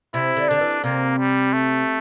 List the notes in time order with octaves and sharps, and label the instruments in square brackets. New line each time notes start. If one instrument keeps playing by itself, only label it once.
[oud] C3 [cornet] E4
[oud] D3
[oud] D3 [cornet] D4
[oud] E3
[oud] C3 [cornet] A#3
[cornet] G3
A3